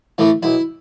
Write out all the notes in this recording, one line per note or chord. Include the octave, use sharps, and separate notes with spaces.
A2 E3 A3
B1 E4